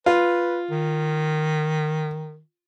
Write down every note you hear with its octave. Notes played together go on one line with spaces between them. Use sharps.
F4 B4
D#3